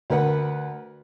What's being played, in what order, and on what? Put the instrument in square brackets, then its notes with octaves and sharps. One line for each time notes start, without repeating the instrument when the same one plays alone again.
[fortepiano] D2 A#4 B4 F#5